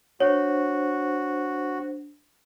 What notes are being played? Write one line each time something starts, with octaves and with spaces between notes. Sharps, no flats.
D4 F#4 C5 C#5